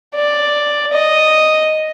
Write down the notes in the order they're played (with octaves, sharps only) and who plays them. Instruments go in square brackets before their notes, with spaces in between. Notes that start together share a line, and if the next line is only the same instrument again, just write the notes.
[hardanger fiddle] D5
D#5